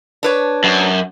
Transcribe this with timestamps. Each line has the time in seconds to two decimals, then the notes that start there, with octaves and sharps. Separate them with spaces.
0.23 D4 B4 C#5
0.64 F#2